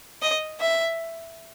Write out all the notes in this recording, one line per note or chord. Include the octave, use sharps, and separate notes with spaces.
D#5
E5